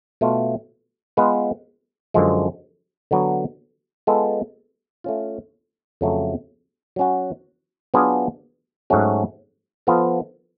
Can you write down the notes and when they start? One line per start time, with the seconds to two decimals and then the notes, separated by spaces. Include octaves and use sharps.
0.21 B2 A3 F4
1.17 G#3 B3 F4 B4
2.14 F#2 D3 F3 G#3
3.11 D3 F#3 B3
4.07 G#3 B3 F4 A4
5.04 A3 C#4 F4
6.01 F2 C#3 F#3 A3
6.96 F#3 C#4 F#4
7.94 F#3 B3 D4 F4 G#4
8.90 G#2 F#3 A3 C#4 F#4
9.87 F3 B3 F4 A4